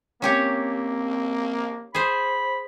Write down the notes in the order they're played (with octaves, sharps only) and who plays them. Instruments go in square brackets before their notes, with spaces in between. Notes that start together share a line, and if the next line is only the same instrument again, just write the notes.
[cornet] A#3 [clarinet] C4 [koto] C#4 G4 C#5
[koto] G#4 C5 [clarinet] B5